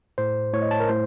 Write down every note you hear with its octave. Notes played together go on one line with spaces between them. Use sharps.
A2 C5
A2 C#5
D#5
A5
A#4
A2 C5